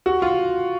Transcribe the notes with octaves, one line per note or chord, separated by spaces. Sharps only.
F#4
F4